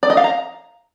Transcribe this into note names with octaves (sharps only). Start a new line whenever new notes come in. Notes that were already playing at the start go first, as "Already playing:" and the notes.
D5
D#5
F5
A#5